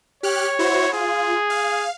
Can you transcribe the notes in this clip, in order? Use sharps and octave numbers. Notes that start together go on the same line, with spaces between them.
G4 C#5 F6 F#6
E4 F#4 C5
F4 G#4
F5